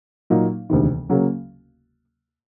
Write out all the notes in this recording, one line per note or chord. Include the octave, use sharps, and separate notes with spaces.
A#2 F#3 A#3 D#4
E1 D2 C3 D#3
C#3 F#3 A#3 C#4